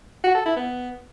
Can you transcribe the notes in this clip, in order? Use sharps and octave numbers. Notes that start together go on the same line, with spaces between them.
F#4
A4
E4
B3